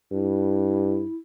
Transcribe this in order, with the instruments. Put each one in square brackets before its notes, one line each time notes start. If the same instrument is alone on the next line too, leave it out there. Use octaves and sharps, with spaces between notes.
[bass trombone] G2 [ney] E4